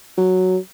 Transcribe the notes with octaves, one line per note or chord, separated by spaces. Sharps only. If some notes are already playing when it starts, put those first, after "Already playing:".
F#3